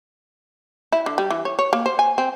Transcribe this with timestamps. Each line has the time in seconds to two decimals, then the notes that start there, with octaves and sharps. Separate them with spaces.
0.92 E4
1.06 D3
1.18 G3
1.30 E3
1.45 C#5
1.59 C#5
1.73 A#3
1.86 C5
1.99 G#5
2.18 C4